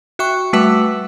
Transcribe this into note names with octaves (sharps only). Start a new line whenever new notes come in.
F#4 E5 G5 C#6
G3 A3 F#4 B4 E5 F#5